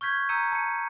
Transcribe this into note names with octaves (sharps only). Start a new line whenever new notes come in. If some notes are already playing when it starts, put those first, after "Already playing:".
C#6 F6 G6 G#6 B6
A#5 E6 G6 C#7 D#7
A5 C#7